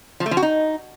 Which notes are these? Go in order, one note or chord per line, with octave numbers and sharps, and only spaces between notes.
F3
A3
F3
F#4
D#4